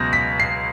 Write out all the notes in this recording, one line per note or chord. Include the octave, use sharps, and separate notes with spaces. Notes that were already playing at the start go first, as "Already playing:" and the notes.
Already playing: C#2 B2 F#3 G6 A#6
B6
C7